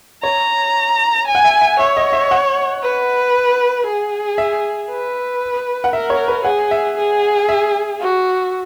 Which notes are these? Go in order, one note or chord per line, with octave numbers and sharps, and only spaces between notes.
C#5 A#5
G#5
F#5
E5
E5
C#5 E5
D#5
E5
F#5
B4
G#4
E5
B4
F#5
A#4 E5
C#5
B4
G#4 F#5
E5
G#4
E5
F#4